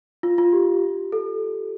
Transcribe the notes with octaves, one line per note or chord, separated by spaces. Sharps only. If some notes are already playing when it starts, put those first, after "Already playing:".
F4
F4
G4
A4